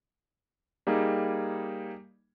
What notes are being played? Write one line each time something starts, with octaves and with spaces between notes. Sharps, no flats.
G3 A#3 D#4 G#4